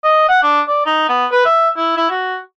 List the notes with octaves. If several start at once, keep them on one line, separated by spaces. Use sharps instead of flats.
D#5
F#5
D4
D5
D#4
B3
B4
E5
E4
E4
F#4